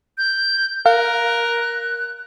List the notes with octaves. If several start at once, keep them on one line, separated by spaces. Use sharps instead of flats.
G6
A#4 F5 F#6